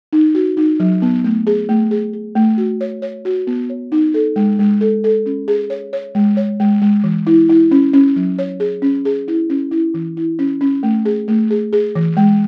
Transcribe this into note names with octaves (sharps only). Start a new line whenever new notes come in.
D#4
F#4
D#4
F#3
B3
A3
G#4
A3
G#4
G#4
A3
F#4
C#5
C#5
F#4
B3
C#5
D#4
A4
G#3
G#3
A4
A4
C#4
G#4
C#5
C#5
G#3
C#5
G#3
G#3
E3
E4
E4
C#4
C#4
F#3
C#5
G#4
C#4
G#4
E4
C#4
E4
E3
E4
C#4
C#4
A3
G#4
A3
G#4
G#4
E3
G#3